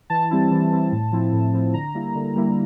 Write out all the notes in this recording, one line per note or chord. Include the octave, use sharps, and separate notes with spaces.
E3 A5
G3 C4 E4
E3
G3 C4 E4
A2
F3 C4 E4
A2
F3 C4 E4
D3 A#5
G3 A#3 E4
D3
G3 A#3 E4